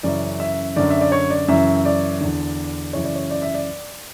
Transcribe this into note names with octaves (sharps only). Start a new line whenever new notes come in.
F#2 C#3 E3 D5
E5
F#2 D3 D5
E5
D5
C#5
D5
F#2 C#3 E3 E5
D5
E2 D3
F#2 C#3 E3 C#5
D5
C#5
D5
E5
D5